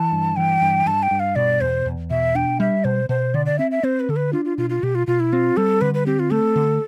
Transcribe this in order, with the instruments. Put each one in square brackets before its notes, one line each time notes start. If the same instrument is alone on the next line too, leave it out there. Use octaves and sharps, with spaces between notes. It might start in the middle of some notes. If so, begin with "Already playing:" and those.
Already playing: [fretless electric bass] E3 [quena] A5
[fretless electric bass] G2
[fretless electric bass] E3 [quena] G5
[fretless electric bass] G2
[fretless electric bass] G2 [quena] A5
[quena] G5
[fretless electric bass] G2
[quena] F5
[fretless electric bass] B2 [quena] D5
[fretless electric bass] E2 [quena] C5
[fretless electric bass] E2
[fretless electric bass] B2 [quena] E5
[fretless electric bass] D4 [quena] G5
[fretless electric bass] G3 [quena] E5
[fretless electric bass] B2 [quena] C5
[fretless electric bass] B2 [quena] C5
[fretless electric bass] D3 [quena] D5
[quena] D5
[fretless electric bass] C4 [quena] E5
[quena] E5
[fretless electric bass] C4 [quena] C5
[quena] B4
[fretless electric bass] D3 [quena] A4
[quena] B4
[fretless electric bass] D4 [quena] F4
[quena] F4
[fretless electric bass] B2 [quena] F4
[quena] F4
[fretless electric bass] B2 [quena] G4
[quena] F4
[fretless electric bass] B2 [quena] F4
[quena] E4
[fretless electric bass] C4 [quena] F4
[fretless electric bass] G3 [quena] A4
[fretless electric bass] D3 [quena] B4
[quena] B4
[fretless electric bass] C4 [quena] G4
[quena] F4
[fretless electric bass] A3 [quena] A4
[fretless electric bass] D3